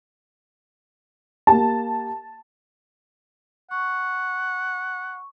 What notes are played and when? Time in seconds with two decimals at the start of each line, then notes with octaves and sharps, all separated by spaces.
1.47 A#3 G4 A5
3.71 F#5 C#6